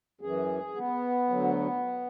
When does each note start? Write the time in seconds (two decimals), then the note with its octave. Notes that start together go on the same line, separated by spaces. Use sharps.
0.21 F#2 E3 G#4
0.76 B3
1.30 D2 D3 F#3